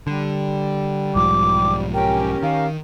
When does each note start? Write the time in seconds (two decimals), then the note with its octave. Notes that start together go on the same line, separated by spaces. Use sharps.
0.07 D3 G3
1.15 B1 G#2 F3 D6
1.94 C#4 G4 A#4 G5
2.43 D#3 F5